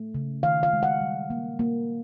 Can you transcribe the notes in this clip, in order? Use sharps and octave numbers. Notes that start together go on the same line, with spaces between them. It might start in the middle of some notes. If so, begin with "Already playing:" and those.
Already playing: A3
C#3
D#3 F5
F5
G#3
F#5
G3
A#3
A#3